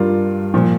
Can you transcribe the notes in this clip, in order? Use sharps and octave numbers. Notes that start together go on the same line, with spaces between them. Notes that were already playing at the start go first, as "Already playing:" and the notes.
Already playing: G2 G3 D4 F4 A#4
A#2 F3